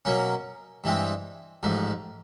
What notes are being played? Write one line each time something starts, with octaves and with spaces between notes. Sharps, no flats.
B2 F#3 A#3 C#4
G2 E3 G#3 C4
A1 G#2 F3